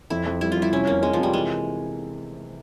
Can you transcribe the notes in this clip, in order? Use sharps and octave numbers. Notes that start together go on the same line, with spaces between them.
F2 E4
F2
G3 E4
F4
G3
E4
C3 C#4
F1 A#3
F1 G#3
C3 F3
G3
E3 G#3